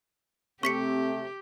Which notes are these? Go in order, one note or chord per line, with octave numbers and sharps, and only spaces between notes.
C3 A3 C4 G4 C#6 B6 C#7